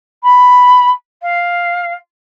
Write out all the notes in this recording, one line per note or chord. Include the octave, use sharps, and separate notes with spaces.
B5
F5